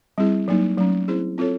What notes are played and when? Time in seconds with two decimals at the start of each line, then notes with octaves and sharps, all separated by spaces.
0.18 G3 C4 E4 G#4
0.48 F#3 A#3 D#4
0.78 F#3 A3 C#4
1.08 C4 E4 G#4 C5
1.38 C4 F4 A4 C#5